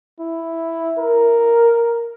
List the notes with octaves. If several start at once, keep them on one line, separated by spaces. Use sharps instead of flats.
E4
A#4